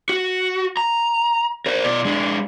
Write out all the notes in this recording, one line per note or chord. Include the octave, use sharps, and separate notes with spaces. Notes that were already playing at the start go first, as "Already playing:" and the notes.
F#4
A#5
A#4 C5
B2 D5
G#3 D4